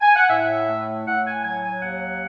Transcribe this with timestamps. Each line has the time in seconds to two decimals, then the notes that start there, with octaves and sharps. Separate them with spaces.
0.01 G#5
0.16 F#5
0.29 A2 E5
0.67 A3
1.06 A2 F#5
1.25 G#5
1.43 F#3 G#5
1.63 G#5
1.81 D#2 F#5